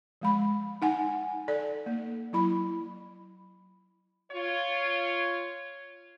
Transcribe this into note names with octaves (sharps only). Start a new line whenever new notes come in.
F3 G#3 B5
D#4 F#5 G#5
A4 D5
A#3
F#3 E4 B5
F4 C#5